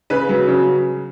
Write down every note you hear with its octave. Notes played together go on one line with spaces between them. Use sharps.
C#3 B4
F#3
C#3